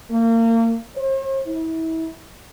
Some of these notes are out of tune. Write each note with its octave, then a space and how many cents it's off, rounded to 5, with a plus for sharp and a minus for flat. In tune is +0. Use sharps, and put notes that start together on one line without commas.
A#3 -35
C5 +45
E4 -30